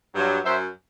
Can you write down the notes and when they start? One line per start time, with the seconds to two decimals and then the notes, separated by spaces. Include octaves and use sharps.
0.15 G2 F#3
0.44 F#2 F#3 C5 E5